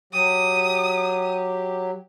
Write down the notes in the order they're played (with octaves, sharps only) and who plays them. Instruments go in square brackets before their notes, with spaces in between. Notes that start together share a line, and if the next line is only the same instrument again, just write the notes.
[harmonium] F#3 G4 [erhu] D#6